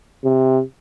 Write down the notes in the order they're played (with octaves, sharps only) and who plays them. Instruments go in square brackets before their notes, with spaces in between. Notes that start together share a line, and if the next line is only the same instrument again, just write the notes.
[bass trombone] C3